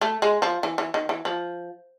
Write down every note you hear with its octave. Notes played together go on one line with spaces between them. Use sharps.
A3
G#3
F3
E3
E3
D#3
E3
F3